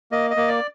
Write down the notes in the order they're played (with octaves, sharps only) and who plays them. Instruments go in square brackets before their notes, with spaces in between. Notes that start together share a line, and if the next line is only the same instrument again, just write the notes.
[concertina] A#3 D#5
D#5
A#3
D5